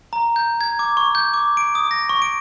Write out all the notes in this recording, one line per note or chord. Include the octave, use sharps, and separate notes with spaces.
A#5
G6
G#6
D6
C#6
G6
D6
D7
D#6
A#6
C#6
D7